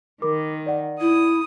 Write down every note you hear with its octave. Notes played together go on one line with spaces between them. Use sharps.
D#3 A#4 B5 D6
D5 F#5
E4 D#6